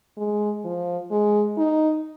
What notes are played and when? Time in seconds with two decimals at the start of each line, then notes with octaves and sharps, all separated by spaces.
0.17 G#3
0.65 F3
1.11 G#3
1.58 D#4